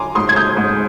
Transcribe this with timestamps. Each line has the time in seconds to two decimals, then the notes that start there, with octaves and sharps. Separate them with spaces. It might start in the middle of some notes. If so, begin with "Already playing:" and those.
Already playing: G#5 A#5 C6 D6
0.15 G#2 C6 D#6
0.29 G#6
0.36 D#6 G6
0.57 G#2